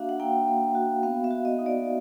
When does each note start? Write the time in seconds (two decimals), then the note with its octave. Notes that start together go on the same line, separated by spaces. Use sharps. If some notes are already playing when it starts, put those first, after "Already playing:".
Already playing: A#3 D4 F#4 E5 F5
0.09 F#5
0.20 A#3 G5
0.47 A#3
0.75 F#4
1.03 B3 F5
1.24 E5
1.31 F#4
1.45 D#5
1.59 D#4
1.66 D5